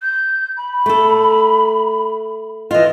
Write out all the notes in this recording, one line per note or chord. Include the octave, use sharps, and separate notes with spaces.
G6
B5
A3 A4
E3 F4 D#5